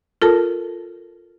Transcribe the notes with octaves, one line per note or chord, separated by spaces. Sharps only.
F4 A4 A#4 A5